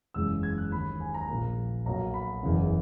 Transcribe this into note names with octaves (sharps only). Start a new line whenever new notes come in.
F#1 E2 C#3 G#3 E6
G#6
F#6
D#2 D#3 G#3 B5
G#5
A#5
A#1 A#2 A#3
B1 B2 F#3 A#3 A#5
B5
F#1 E2 C#3 E3